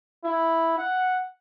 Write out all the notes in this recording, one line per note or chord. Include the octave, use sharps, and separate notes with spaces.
E4
F#5